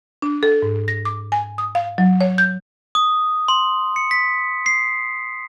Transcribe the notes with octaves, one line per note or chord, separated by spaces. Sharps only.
D4
A4
G#2
A#6
D6
G#5
D#6
F5
F#3
C#5
G6
D#6
C6
C#7
B6
C7